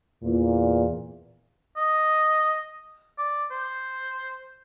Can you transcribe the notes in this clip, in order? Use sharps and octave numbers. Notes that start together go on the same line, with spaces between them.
E2 A#2
D#5
D5
C5